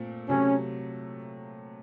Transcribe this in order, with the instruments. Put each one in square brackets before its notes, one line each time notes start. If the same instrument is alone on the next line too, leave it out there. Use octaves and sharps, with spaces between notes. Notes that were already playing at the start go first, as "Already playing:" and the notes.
Already playing: [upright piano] A#2 A3 C4
[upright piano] C3 F#3 A3 [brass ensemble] C#4